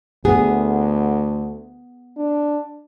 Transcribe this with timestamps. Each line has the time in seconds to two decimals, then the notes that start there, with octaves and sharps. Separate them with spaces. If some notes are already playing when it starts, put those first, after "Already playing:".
0.25 D2 B3 G#4
2.17 D4